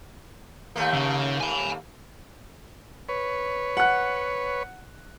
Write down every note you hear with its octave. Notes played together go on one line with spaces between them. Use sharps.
D#2 A3 A#3
C#3
G#5 B5
B4 C#5
F#5 F#6